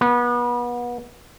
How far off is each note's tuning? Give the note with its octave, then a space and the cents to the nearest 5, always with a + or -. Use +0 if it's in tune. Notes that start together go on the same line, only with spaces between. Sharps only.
B3 -30